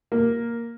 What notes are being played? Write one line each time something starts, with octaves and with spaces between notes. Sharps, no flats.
A#3